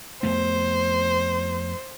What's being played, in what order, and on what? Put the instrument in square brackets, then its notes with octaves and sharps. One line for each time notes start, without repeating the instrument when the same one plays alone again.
[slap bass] F2 A3 B3 [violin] C5